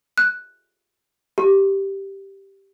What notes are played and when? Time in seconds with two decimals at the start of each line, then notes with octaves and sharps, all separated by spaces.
0.18 F#6
1.38 G4